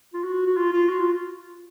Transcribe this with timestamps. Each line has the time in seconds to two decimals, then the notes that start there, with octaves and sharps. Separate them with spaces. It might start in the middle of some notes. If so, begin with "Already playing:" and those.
0.14 F4
0.24 F#4
0.46 F#4
0.57 F4
0.73 F4
0.89 F#4
1.00 F4